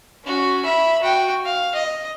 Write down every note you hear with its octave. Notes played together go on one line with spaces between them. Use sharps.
C#4 F#4
E5 B5
F#4 G5
F5
D#5